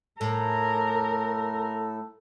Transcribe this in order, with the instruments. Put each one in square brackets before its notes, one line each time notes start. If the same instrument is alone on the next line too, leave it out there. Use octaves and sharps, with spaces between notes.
[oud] A2 [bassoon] A4 [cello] A#4